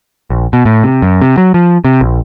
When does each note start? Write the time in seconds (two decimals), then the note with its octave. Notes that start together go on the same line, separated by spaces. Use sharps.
0.30 A#1
0.53 B2
0.65 A2
0.83 C3
1.02 F#2
1.21 C3
1.38 F#3
1.54 F3
1.85 C3
2.01 A#1